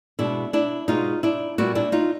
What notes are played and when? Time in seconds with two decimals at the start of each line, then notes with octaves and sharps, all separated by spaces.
0.19 B2 G#3 B3 D4 E4
0.53 D4 E4
0.88 B2 G#3 B3 D#4 F4
1.23 D4 E4
1.58 A#2 G3 B3 E4 F#4
1.75 D4 E4
1.92 D#4 F4